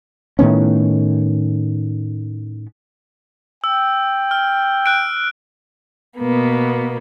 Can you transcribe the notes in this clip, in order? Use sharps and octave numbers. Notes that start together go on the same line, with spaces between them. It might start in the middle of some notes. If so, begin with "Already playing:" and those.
A2 D#3 B3 C#4
G5 E6
F6
F#6 D7
B2 A#3 B3